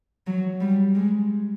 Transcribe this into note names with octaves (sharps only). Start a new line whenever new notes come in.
F#3
G3
G#3